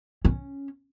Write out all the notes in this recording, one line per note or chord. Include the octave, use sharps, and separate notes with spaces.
C#4